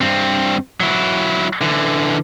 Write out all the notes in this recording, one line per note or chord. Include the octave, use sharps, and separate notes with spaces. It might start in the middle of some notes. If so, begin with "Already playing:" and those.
G2 C4
F#3 E4
D3 E3